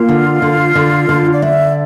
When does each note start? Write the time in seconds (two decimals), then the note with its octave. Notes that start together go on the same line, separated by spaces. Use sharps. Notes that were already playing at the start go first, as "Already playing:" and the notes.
Already playing: A#3 F4
0.09 D3
0.42 D3
0.75 D3
1.09 D3
1.33 D5
1.42 D4 E5